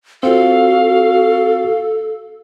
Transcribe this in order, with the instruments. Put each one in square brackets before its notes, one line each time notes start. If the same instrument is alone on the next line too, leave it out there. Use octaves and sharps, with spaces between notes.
[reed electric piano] C4 F4 [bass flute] F#4 [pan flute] A4 [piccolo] F5